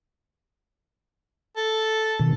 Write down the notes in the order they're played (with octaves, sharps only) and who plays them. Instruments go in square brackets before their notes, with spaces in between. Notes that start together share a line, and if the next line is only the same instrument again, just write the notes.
[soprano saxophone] A4
[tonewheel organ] B2 D#3